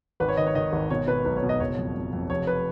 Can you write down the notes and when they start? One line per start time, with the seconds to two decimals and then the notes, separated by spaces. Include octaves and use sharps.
0.20 G#1 B4
0.29 C#5
0.37 D#3 D#5
0.47 C#5
0.55 D#3 D#5
0.72 G#1
0.90 B2 C#5
1.08 B2 B4
1.25 B1 B4
1.36 C#5
1.42 B2
1.49 D#5
1.60 F#1 C#5
1.78 F2
1.95 F2
2.13 F2
2.30 F1 C#5
2.47 B4